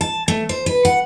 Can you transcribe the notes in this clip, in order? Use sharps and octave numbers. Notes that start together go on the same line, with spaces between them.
A5
A3
C5
B4
F#5